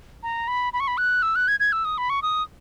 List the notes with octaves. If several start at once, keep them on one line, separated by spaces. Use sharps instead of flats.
A#5
B5
B5
C#6
B5
F#6
E6
F#6
G#6
G#6
E6
D#6
B5
C#6
D#6